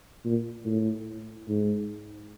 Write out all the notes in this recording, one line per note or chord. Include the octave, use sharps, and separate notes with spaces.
A#2
A2
G#2